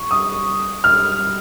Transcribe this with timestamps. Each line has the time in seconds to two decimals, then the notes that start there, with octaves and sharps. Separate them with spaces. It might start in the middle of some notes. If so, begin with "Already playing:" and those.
Already playing: C#6
0.11 D#6
0.84 F6